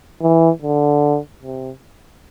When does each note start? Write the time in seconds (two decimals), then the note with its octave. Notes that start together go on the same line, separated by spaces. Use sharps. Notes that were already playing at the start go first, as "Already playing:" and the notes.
0.22 E3
0.62 D3
1.43 C3